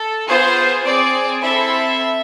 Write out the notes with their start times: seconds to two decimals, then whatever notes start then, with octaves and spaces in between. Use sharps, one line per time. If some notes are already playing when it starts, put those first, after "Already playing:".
Already playing: A4
0.27 B3 F4 G#4 C5
0.85 C4 G#4 D5
1.42 C4 E4 A4 E5